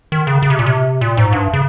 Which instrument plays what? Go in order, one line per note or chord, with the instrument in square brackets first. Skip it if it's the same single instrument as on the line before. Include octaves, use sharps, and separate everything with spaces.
[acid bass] D#3
C#3
C#3
C3
A#2
C3
A#2
G#2
G2
C#3